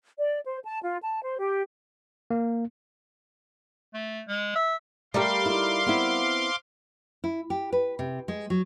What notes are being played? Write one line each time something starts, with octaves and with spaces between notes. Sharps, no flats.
D5
C5
A5
F4
A5
C5
G4
A#3
A3
G#3
E5
G3 A3 G4 A#4 E5 F5 C6 D6
D#4 E4
B3 C4 E4
E4
G4
B4
C3
G#3
F#3